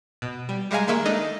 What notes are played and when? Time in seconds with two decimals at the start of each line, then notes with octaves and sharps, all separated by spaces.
0.22 B2
0.49 G3
0.71 G3 G#3 E5 F5 G#5 A#5
0.87 D#3 G#3 A#3 E5 C#6
1.06 D4 D#4 A4 D#5